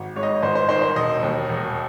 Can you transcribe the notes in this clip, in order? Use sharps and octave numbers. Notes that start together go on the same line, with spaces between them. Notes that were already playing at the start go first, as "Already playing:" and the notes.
Already playing: G#1
G#2 C#5
D#5
C#5
G#1 C5
C5
D#3 C5
C5
E1 D#5
D#2
E1